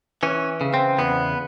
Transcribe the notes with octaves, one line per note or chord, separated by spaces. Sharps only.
E3 C#4
C#3
C4
E2 B3